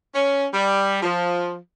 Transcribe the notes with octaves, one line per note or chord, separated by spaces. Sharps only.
C#4
G3
F3